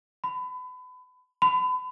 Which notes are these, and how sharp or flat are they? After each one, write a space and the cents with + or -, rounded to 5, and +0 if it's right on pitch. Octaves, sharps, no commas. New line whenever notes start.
B5 +30
B5 +35